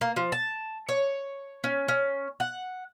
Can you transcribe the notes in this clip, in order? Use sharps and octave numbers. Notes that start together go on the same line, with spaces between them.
A#3
F3
A5
C#5
C#4
C#4
F#5